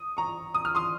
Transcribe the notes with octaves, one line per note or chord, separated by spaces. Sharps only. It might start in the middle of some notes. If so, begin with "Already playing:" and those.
Already playing: D#6
A#5 C#6
D#6
F6
C6 D#6